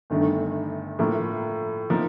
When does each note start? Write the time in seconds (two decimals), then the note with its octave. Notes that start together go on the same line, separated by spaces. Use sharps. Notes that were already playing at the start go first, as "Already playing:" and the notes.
0.10 G1 G2 D#3 A3
0.99 A2 F3 A#3
1.90 F3 A#3 D#4